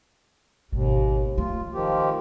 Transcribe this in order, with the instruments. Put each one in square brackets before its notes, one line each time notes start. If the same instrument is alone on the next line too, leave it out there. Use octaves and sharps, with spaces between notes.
[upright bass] G#1 B2 [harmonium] D#2
[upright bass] A3 [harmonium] F4
[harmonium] D#3 F3 G4